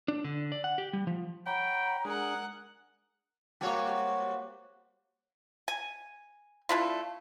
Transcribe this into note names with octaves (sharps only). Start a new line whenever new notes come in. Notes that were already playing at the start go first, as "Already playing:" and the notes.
D4
D3
D5
F#5
G4
G3
F3
C#5 F#5 G5 A#5 B5
G#3 D4 G#4 A#4 F#5
G3 A#3 C4 F#4 G4 C#5
G#5
A3 D4 E4 F4